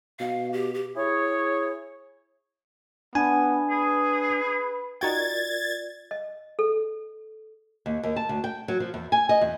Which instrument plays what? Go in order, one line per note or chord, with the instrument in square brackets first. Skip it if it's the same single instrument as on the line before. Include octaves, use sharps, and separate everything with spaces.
[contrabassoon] B2 [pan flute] F5
[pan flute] G4
G4
[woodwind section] E4 G#4 C#5
[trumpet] B3 [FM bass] D4 [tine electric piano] G#5
[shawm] G#4 [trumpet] B4
[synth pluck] D#4 F#4 G5 [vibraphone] F4 A#4 D5 [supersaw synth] G#6 A6
[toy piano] D#5
A4
[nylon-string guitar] D#2
D#2
A5
D2
G5
F#3
F3
E2
G#5
D#5
E2